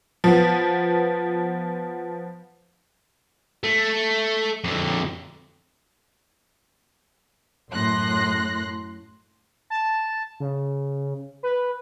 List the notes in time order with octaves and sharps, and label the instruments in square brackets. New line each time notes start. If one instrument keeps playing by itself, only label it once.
[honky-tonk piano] F3 B3
[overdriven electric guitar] A3
F2 D3
[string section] F#2 A2 C6 F#6 A#6
[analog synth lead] A5
C#3
B4